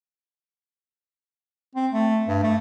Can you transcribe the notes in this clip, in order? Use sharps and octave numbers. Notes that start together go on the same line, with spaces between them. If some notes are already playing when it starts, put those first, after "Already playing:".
C4
A3
G2
A3